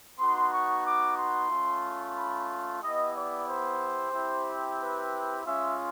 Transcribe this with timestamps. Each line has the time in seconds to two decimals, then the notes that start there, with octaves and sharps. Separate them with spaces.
0.17 B3 D#4 F#4 C6
0.51 C#6
0.84 D6
1.17 C6
1.49 A3 C#4 F4
2.15 B5
2.80 B3 E4 G4 D#5
3.14 D5
3.46 C5
4.12 C4 E4 G4
4.78 B4
5.43 G#3 C#4 F4 E5